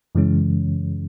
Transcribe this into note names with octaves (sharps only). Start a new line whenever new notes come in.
F#2 C#3 E3 G#3 C#4